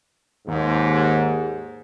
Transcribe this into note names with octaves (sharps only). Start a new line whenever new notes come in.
D#2 G#2